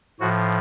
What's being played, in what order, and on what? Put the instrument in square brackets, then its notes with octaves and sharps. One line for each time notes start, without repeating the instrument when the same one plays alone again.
[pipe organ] A2 F3 F#4